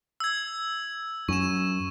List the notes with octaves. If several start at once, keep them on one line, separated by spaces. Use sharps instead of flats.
E6 G#6
F#2 C#6 E7